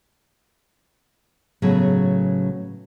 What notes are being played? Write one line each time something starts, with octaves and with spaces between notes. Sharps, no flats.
A2 C#3 F#3 B3 G#4